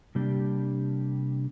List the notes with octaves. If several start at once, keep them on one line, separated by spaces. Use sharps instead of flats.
C3 G3 A#3 D4 G4